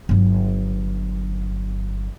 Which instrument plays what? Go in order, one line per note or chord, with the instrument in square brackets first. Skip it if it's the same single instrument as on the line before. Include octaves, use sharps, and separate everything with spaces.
[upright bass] G1 F#3